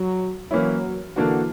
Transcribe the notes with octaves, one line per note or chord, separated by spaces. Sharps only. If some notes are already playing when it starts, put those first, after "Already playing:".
Already playing: F#3
E3 F#3 A#3 C#4 E4
D3 E3 A#3 D4 F#4